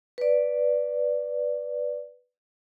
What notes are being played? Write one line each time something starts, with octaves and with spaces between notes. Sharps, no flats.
B4 D5